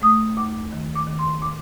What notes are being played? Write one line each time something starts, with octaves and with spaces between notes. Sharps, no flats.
A3 D#6
D#2 D6
D#3
D6
D#3
C6
A2 D6